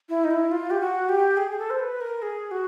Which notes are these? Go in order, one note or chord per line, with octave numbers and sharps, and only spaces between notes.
E4
D#4
E4
F4
G4
F#4
G4
G#4
G#4
A4
C5
B4
A#4
G#4
F#4